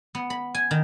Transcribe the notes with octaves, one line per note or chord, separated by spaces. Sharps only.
B3
B5
G#5
D#3